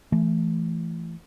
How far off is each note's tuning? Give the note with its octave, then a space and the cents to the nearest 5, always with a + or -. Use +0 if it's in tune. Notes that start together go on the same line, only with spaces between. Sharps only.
E3 +25 A3 +0